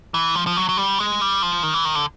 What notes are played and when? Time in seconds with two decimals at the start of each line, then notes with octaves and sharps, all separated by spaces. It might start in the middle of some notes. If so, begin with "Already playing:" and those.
0.14 E3
0.35 F3
0.47 F3
0.57 F#3
0.69 F#3
0.77 G3
0.99 G#3
1.21 G3
1.42 F3
1.63 D#3
1.74 E3
1.85 D#3
1.95 D3